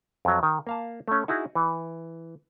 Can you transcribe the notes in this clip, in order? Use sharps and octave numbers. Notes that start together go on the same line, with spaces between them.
F2 F#3
D#3
A#3 F5 A5
A3 C#4
D#4 E4 F#4 G#4
E3